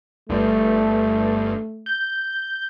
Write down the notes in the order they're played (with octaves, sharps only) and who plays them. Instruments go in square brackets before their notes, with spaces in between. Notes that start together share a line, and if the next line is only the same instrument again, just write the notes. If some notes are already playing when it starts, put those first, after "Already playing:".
[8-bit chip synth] G1 G2 [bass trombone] A3
[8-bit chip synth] G6